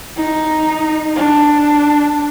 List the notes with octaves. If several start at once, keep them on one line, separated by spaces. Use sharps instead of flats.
D#4
D4